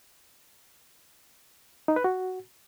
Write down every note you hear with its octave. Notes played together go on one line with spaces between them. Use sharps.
D#4
B4
F#4